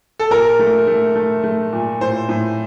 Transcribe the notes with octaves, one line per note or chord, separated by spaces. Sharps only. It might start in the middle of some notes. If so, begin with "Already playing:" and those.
A4
A#2 A#4
A3
A3
A3
A3
A#2
A2 C5
A2